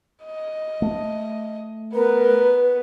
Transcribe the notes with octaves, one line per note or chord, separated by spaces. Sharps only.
D#5
A3
B3 A#4 B4